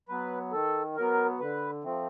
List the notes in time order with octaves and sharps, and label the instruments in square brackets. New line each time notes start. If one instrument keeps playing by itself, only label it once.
[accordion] F#3 B3 B4
D#3 A4
F#3 B3 A#4
D3 B4
F3 A3 C4